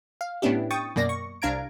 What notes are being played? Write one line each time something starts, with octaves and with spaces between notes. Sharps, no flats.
F5
A2 B3 C#4 D4 E4 G4
G5 C#6 D#6 A6
F#2 B2 A#3 D5 A#6
C#6
C2 D4 F5 A#5 G#6 D7